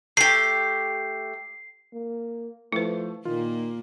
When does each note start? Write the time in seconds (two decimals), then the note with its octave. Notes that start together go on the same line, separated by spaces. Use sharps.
0.17 A3 G4 C7
1.93 A#3
2.72 F3 A3 E4 B4
3.25 A#2 D#3 A#3 F4